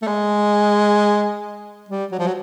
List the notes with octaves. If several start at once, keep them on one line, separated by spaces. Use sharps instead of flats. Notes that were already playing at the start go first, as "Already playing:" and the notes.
A3
G#3
G3
F#3
F3
F#3